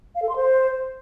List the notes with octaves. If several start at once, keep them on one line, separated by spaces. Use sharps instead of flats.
F5
A4
C6
C5